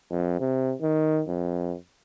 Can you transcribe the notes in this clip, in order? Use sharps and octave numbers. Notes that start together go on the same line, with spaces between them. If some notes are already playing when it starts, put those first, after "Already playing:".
F2
C3
D#3
F2